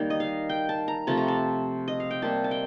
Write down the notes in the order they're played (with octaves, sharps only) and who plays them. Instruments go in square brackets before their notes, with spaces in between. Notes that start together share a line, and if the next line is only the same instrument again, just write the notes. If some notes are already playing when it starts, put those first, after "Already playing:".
Already playing: [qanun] D#3 G3 A#3
D#5
F5
G5
A5
A#5
C3 F3 A3 A5
A#5
A5
D#5
F5
G5
C3 G3 A#3 A5
A5
G5